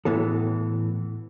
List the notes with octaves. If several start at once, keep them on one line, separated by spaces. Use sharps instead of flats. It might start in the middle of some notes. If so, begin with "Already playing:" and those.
A2 E3 B3 A4